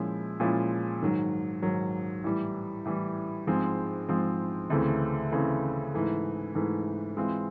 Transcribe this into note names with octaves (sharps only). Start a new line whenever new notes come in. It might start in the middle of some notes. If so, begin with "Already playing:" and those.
Already playing: A#2 F3 G#3 C#4 E4
A#2 F3 G#3 C#4 E4
G#2 D#3 F#3
G#2 D#3 F#3
A2 E3 G3
A2 E3 G3
G#2 F3 G#3 C4
G#2 F3 G#3 C4
D2 C#3 E3 A3 C4
D2 C#3 E3 A3 C4
G#2 E3 A3
G#2 E3 A3
E3 G#3 C4 F4